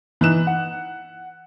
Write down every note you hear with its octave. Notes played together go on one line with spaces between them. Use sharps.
E3 D#4 F#6 E7
F#5